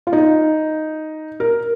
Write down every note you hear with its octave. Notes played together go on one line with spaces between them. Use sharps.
F4
D#4
A#4